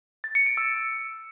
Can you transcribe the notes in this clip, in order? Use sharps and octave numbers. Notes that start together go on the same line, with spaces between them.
A6
C#7
D7
E6